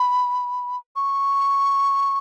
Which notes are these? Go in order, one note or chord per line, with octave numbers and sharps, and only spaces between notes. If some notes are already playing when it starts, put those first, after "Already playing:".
Already playing: B5
C#6